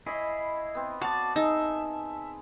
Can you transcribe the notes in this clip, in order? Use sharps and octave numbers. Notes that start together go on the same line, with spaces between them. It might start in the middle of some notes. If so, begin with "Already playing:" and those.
E4 G#4 C#5 D#5 B5
B3 C4
F#4 D5 F5 A5
D#4 G#4 E5